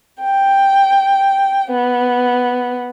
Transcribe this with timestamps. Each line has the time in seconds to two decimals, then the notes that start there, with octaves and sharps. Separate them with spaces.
0.21 G5
1.71 B3